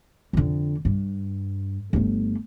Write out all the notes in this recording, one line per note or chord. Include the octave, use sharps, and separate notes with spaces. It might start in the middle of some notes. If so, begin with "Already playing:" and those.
F2 D3
G2
G1 A3